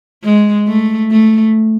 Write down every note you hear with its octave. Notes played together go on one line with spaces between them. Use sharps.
G#3
A3
A3